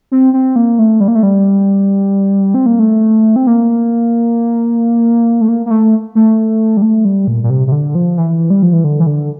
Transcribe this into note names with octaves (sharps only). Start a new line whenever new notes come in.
C4
C4
A#3
A3
G3
A#3
A3
G3
C4
A#3
A3
C4
A#3
A3
A#3
A#3
A3
A3
G3
A3
G3
A#2
A#2
C3
C3
D3
F3
E3
G3
F3
E3
D3
E3
D3